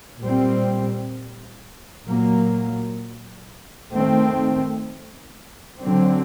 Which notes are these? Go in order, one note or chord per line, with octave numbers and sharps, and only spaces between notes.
A#2 G3 C4
A#2 F#3 A#3
D#3 A3 C4
D3 F#3 C4